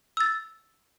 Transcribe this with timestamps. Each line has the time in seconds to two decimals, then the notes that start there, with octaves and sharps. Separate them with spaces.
0.17 E6 A6